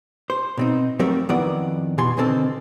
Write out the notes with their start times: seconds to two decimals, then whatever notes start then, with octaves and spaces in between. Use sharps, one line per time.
0.30 C5
0.57 B2 C4 D#4
0.99 F2 F#3 G3 A3 C4 A#4
1.29 F2 D#3 B3 E4 D5 F#5
1.98 B2 E3 G#5 C6
2.17 B2 D3 D#3 C4 A4